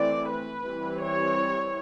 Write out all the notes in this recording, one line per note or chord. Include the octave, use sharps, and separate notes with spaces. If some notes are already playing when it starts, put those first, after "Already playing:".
Already playing: E3 A3 C4 D5
B4
E3 G3 C4
C#5